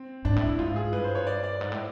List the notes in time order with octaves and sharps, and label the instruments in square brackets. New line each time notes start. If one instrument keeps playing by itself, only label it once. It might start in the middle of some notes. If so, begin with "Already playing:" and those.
Already playing: [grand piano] C4
[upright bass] G#2 [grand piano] D4
[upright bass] A2
[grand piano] E4
[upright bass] A2
[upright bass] G#2 [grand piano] F4
[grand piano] G#4
[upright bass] G2 [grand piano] B4
[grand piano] C5
C#5
D5
D5
[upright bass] G#2
A2